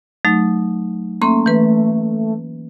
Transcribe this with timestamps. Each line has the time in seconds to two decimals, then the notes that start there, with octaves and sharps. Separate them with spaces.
0.25 F#3 A3 D#4
1.22 A3 A#3 C#4 C6
1.46 E3 B4